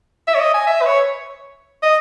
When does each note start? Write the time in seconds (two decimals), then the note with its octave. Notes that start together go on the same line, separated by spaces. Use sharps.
0.28 E5
0.35 C#5
0.40 D#5
0.54 G#5
0.67 E5
0.81 B4
0.86 C#5
1.82 D#5